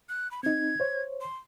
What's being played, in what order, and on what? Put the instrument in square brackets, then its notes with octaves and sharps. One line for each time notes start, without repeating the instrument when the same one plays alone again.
[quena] F#6
B5
[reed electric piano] C4 D#4 [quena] G#6
[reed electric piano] C5 C#5
[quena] C6